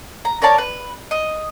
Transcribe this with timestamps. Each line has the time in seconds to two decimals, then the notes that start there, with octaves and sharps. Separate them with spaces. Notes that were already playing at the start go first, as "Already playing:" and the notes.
0.25 A#5
0.42 A#4 C#5 D5 A5
0.58 B4
1.11 D#5